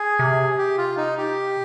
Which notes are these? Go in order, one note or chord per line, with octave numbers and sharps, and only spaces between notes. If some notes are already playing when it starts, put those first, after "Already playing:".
Already playing: G#4
C3
G4
F4
D#4
G4